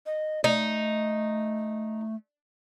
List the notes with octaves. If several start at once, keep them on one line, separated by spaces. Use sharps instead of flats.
D#5
A3 D#4